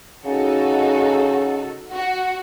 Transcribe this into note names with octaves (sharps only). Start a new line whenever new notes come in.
C#3 D#4 F#4 A4
F#4